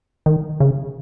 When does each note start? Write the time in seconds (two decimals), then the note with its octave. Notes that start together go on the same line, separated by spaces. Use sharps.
0.26 D#3
0.60 C#3